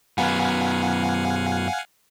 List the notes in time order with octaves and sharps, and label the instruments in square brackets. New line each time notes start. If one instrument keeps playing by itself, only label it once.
[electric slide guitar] F#2 B3 [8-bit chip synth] F5 F#5 G#5